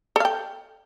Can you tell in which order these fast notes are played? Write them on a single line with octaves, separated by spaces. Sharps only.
A4 F5 G5